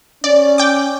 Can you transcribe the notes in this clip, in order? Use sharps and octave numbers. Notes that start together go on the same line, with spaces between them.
C#4 D5
G5 D6